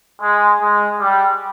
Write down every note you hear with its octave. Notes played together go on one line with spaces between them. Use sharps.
G#3
G#3
G3